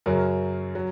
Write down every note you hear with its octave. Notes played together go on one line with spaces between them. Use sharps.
F#2 C#3 F#3 A#4
F#3